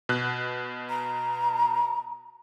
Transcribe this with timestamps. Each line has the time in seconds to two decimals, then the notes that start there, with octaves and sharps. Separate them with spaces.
0.09 B2 F#6
0.89 A#5